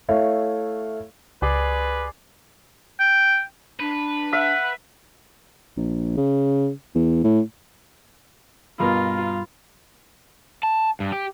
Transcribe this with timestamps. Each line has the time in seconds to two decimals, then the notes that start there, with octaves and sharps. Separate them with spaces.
0.09 A3 E4 C#5 F5
1.42 C#2 G#4 B4 D5 C6
3.00 G5
3.80 D4 B4
4.33 E5 F#5
5.77 A#1
6.17 C#3
6.95 E2
7.24 A2
8.80 G2 B2 F4 A#4 B5
10.63 A5
11.00 G2
11.12 G4